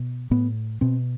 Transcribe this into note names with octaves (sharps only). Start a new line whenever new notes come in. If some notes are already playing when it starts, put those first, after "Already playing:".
Already playing: B2
A2 B3
B2 C4